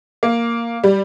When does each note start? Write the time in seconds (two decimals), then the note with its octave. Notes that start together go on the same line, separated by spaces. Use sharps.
0.23 A#3
0.84 G3